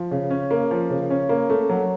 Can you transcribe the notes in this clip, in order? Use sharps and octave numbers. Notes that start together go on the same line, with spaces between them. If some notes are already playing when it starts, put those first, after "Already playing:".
Already playing: F3
C#3
C#4
A#3
F3
C#3
C#4
A#3
A3
F#3